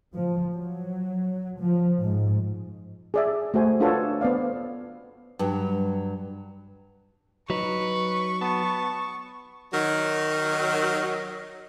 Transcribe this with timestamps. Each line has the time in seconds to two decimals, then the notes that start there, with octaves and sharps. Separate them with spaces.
0.14 F3
0.53 F#3
1.62 F3
2.04 G#2
3.14 G#4 D5 E5
3.54 A3 F#4 C5 G#5
3.80 D4 F4 F#4 A4 B4 C#5
4.21 B3 C5 D5 F5
5.39 G2 F#3
7.50 F#3 D#4 B4 C#6
8.41 B3 A5
9.73 D#3 F#3